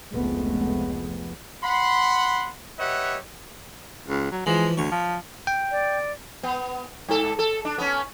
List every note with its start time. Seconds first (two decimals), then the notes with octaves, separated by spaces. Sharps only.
0.14 F1 C#2 F3 G#3 A3 B3
1.64 F#5 B5 C6
2.79 G4 B4 C#5 D#5 E5 F#5
4.08 C#2
4.32 F#3
4.46 E3 F3 G#3
4.77 D2 C#5
4.91 F3
5.47 G5
5.71 D5
6.43 B3
7.08 G#2 A4
7.39 A4
7.65 D4
7.78 B3 C#4